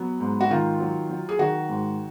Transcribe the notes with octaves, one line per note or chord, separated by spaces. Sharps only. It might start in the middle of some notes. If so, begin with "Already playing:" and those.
Already playing: F#3 B3
G#2
F#4
D#3 F4
F#3
F#3
G#4
D#3 F#4
G#2